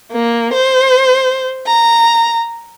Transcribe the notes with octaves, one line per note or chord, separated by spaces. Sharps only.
A#3
C5
A#5